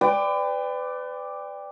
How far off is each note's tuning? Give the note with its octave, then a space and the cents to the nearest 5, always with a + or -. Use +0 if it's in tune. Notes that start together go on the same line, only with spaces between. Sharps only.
B4 +35 D5 +0 G5 +25